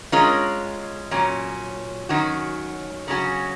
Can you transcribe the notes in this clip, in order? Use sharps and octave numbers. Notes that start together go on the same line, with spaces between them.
G#3 C#4 F4 A#4 C#5
A#2 F#3 C#4
D#3 F#3 C#4 F#4
C#3 F#3 A#3 C#4 F#4